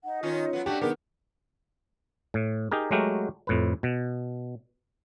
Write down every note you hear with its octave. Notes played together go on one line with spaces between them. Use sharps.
D#4 F#5
D#3 C#4 F4
F#3 B3
A3 D4 F#4 G4
D#3 B3 G4 G#4
A2
D#4 G4 G#4 A#4
F#3 G#3 A3 F#4 G4 A#4
F2 A2 B4
B2